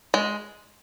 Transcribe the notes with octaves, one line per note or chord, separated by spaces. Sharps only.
G#3